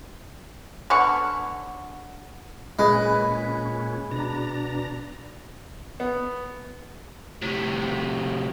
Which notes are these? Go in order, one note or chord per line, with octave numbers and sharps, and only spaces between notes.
D3 B3 C#4 C#6
A#2 G#3 C#4 B4
B2 D4 A#5
B3
A2 C3